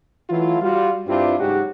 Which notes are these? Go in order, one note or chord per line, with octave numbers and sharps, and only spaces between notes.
E3 F#3 A3 E4 F4
G3 F4 F#4
G2 C4 D4 E4 F4 G4
G#2 C#3 F#3 F#4 G4